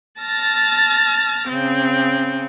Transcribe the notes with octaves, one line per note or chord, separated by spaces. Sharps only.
A5 F6 A6 A#6
C#3 C4